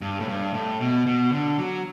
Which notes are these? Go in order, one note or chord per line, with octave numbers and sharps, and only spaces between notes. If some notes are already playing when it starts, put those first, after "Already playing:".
G2
A2
G2
A2
B2
B2
D3
F#3